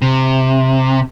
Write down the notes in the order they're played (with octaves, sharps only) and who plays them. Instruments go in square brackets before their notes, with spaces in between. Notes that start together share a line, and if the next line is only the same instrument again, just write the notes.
[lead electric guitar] C3